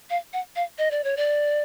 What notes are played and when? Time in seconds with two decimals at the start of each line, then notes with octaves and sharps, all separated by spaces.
0.10 F5
0.33 F#5
0.56 F5
0.78 D#5
0.91 D5
1.04 C#5
1.17 D5